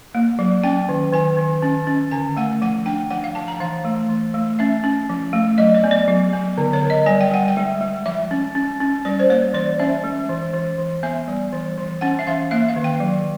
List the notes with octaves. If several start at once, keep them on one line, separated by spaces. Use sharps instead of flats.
A#3
F#3
C#4 G5
D#3
D#3 G#5
D#3
C#4
C#4
D3 G#5
A3 F#5
F3 F#5
D4 G5
F3 F#5
F5
F3 A5
A#5
E3 F5
A3
E3
A3
C#4 E5
C#4
F3
A3
F#3 D#5
D5
B3
D5
F#3
B3
D3
C#5
D3
D#5
G3 G#5
G5
G3 F#5
G5
G#3
G#3
F3 E5
C#4
C#4
C#4
G3 D5
C5
A#3 C#5
E3 D5
C#4 E5
G#3
E3
E3
E3
B3 E5
G3
E3
E3
C#4 F#5
E5
E3 F5
A#3 E5
F5
D#3
G5
F#3